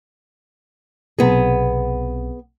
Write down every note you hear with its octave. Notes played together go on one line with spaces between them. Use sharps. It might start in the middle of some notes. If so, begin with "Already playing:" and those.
B1 C3 B3 G#4